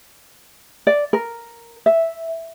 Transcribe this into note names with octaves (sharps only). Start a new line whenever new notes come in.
D5
A#4
E5